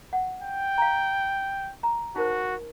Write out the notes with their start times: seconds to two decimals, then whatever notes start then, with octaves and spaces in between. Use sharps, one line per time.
0.13 F#5
0.42 G5
0.78 F5 A#5
1.83 A#5
2.16 D#4 F#4 A#4 C5